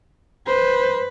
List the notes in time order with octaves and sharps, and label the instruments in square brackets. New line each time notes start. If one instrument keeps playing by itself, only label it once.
[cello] B4 [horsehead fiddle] C5